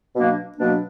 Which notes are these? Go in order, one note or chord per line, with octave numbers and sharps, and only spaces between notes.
B2 F#3 A#3 D4
B2 F#3 A#3 D4